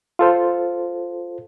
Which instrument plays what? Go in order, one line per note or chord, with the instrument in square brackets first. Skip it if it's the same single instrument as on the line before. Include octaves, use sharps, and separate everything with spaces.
[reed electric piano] F4 A4 C5